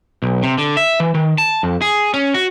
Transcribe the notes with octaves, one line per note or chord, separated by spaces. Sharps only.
B1
C3
D3
E5
E3
D#3
A5
F2
G#4
C#4
F#4